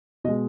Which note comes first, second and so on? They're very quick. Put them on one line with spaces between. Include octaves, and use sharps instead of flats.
B2 D#5 G#3